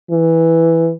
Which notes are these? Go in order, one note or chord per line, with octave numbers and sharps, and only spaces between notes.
E3